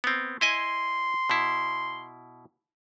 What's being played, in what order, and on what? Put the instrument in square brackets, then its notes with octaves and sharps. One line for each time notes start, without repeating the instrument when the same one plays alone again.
[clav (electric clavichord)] B3 C4
[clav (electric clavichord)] E4 D#5 G#5 [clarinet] C6
[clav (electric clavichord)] B2 E4